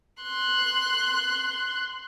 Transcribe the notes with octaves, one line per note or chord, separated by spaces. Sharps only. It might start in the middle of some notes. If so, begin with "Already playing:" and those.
C6 F#6